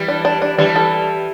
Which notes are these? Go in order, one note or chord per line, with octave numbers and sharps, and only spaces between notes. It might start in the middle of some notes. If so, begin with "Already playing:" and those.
Already playing: E3 G3
D4
D4
D4
E3 G3 D4
A4